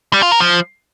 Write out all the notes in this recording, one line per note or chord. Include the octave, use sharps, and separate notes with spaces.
G3
F4
A#4
F3